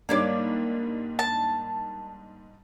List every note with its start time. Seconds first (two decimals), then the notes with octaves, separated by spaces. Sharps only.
0.09 G#2 G3 A#3 D4 C#5 D5
1.19 A5